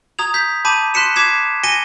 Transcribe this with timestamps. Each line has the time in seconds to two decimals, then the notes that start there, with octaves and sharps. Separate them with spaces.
0.19 A#5 D#6 G#6 F7
0.34 G6 B6
0.65 A5 B5 D6 G6 D#7
0.94 C6 F#6 B6 C#7 E7
1.16 D6 G#6 B6 C7 E7
1.63 G#5 A#6 C#7 D#7 G7